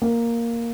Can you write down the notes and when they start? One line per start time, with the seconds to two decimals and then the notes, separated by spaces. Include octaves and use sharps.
0.02 A#3